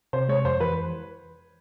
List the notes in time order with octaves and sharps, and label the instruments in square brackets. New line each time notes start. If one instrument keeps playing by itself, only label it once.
[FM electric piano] C3 [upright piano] C5
[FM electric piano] G#3 [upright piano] C#5
[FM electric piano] F2 [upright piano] C5
[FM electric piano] E3 [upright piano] B4